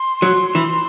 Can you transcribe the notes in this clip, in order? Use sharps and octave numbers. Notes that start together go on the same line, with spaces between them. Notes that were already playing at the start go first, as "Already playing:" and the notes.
Already playing: C6
F#3
E3